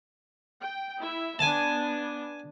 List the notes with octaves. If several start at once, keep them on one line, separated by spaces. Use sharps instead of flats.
G5
E4 E5
B3 D4 G#5 A5